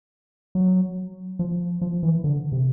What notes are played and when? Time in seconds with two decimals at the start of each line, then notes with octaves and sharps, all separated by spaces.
0.55 F#3
1.39 F3
1.81 F3
2.03 E3
2.24 D3
2.52 C3